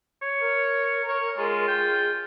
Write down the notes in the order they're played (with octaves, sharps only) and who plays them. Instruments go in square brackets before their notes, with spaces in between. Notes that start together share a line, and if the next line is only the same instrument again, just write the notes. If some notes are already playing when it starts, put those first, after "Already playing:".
[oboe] C#5
[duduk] A#4
[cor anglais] C#5
[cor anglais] G#3 [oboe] F4 [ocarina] G#4
[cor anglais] G5